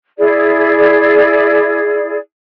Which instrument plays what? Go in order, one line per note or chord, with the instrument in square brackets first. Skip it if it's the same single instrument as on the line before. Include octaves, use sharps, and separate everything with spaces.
[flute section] E4 G#4 D5